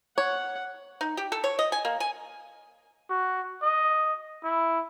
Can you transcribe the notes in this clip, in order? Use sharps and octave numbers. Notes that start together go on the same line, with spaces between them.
C#5 F#5
D#4
G4
A4
C#5
D#5
G#5
A#3
G#5
F#4
D#5
E4